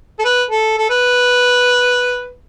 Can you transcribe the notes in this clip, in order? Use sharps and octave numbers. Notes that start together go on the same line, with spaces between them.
A4
B4
A4
A4
B4